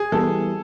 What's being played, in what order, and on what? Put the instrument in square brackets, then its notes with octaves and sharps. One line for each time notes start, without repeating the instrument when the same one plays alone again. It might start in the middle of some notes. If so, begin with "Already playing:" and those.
Already playing: [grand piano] G#4
[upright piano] E3 G3 B3 [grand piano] A4